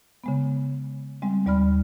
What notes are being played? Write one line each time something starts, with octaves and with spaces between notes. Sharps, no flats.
C#3 G#3 B3
G3 G#3 C4
D#2 G3 D5 B5 F6